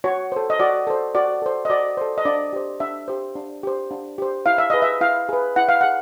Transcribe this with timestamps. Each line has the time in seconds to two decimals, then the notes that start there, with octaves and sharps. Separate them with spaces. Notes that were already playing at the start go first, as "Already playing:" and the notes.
0.04 F#4 C#5
0.32 A4 C5
0.50 D#5
0.60 F#4 D5
0.87 A4 C5
1.15 F#4 D5
1.42 A4 C5
1.65 D#5
1.70 F#4 D5
1.97 A4 C5
2.18 D#5
2.25 D4 D5
2.53 G4 C5
2.80 D4 E5
3.08 G4 C5
3.36 D4
3.63 G4 C5
3.91 D4
4.18 G4 C5
4.46 E4 F5
4.58 E5
4.70 G#4 B4 D#5
4.82 E5
5.01 E4 F5
5.29 G#4 B4
5.56 E4 F#5
5.69 F5
5.81 G#4 F#5